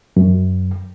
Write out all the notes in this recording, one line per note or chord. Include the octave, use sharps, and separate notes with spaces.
F#2